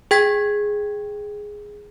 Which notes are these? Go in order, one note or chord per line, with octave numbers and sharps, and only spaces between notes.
G#4 G5 G#6 B6